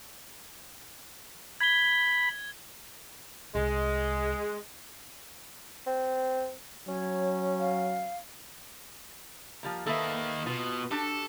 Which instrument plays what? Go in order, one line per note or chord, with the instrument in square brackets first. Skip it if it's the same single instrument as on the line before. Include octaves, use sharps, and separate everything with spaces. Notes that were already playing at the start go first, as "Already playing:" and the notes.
[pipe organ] B5 [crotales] G#6 G7
[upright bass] C2 [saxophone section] G#3
[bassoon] C4
[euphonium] F#3 [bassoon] C#4 [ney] C#5
[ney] F5
[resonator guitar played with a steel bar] F3 G3 A#3
[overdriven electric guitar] D#3 A#3 [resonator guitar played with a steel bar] A4 B4 E5
[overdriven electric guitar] B2 [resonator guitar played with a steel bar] F4
[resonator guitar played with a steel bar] D4 F#4 G4 [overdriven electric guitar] A4